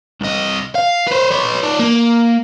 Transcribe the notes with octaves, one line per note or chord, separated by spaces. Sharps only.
C2 D#5
F5
B4 C5
B4 C#5
D#4 D5
A#3